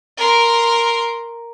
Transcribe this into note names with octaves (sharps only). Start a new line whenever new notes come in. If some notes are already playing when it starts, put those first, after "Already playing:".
A#4 C6